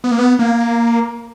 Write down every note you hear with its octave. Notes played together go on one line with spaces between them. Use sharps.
B3
A#3
B3
A#3